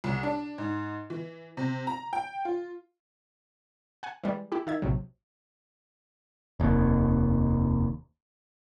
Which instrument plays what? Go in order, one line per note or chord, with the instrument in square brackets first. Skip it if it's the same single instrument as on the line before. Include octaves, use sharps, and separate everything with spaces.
[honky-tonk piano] C2
D4
G#2
E3
C3
A#5
G5
F4
[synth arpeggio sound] F#5 G#5
E3 G3 G#3
E4 G4
D#3 E5 G#6
A#1 C3 F#3
[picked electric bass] F1 D#2